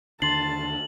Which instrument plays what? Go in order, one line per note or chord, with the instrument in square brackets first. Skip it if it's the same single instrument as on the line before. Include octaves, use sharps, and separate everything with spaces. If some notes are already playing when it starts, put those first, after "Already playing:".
[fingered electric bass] D#2 D3 [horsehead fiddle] A5 [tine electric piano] C6 A6 C7 [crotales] F#7